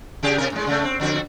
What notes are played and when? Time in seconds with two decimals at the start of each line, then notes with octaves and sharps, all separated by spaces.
0.23 C#3 G4 G#4
0.38 C3 C#4 A#4
0.52 A2 G#3
0.67 C#3 A3
0.84 C4
1.00 F2 D3 F#4